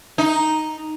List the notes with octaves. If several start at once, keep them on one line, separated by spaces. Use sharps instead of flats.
D#4